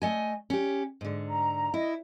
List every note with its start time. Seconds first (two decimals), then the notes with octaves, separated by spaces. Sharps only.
0.02 A3 D#5 G#5
0.50 C#4 G4
1.01 G#2 D3
1.29 A#5
1.74 E4 D#5